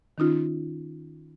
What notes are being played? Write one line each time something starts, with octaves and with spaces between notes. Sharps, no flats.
D#3 C#4 D#4 F4